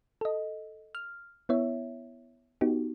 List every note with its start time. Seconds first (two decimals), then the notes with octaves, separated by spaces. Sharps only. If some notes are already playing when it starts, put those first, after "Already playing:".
0.21 A4 D#5
0.95 F6
1.49 B3 E4 C#5 E5
2.61 B3 D#4 F#4 G4